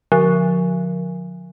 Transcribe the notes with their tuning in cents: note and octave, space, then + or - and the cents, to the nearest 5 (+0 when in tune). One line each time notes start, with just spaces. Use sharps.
D3 +0 F3 +40